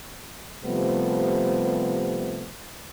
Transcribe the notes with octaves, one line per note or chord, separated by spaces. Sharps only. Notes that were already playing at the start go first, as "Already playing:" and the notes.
C3 F3 G3 A3 B3